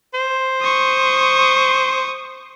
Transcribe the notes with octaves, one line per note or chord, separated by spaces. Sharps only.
C5
C#6 D#6